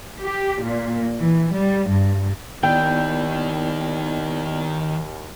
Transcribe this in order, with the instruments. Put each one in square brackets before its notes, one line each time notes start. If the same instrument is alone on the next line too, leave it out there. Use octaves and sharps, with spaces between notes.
[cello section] G4
A#2
E3
G3
G2
[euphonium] D#2 [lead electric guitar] D#3 [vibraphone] B3 E4 D5 [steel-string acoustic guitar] G5